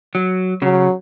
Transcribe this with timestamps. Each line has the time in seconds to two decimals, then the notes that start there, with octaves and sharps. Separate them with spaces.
0.15 F#3
0.62 C#3 F#3